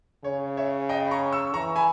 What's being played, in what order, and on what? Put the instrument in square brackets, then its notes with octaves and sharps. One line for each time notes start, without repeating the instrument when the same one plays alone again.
[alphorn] C#3 [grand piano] C#5
[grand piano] C#5 E5
D#5 G5
B5
A#5 C#6
C#6 E6
[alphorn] E3 [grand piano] A#5 C#6
[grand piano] G#5 B5